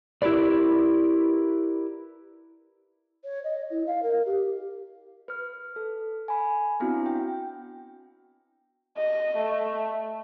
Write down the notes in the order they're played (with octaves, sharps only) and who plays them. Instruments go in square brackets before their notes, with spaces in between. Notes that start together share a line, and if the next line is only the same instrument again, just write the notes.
[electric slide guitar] E4 G4 A#4 B4 D5
[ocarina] C#5
D#5
E4
F5
A#4
G4
[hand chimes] B4 F6
A4
G#5 B5
B3 C4 D4 E4 F#4
G5
[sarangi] D#5
A3